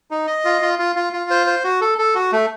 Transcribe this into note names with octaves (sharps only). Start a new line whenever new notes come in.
D#4
D#5
F4
F4
F4
F4
F4
C5
C5
F#4
A4
A4
F#4
A3